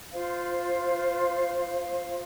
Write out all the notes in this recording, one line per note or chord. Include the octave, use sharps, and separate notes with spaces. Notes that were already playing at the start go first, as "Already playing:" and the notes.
F4 C5 F5